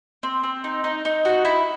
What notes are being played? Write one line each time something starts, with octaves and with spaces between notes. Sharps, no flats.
C4
C4
D#4
D#4
D#4
F#4
E4